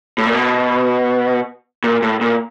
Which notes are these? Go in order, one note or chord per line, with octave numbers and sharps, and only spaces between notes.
A2
A#2
B2
A#2
A2
A#2